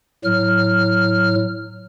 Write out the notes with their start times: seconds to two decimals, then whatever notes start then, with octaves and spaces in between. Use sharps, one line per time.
0.24 A2 F#3 F6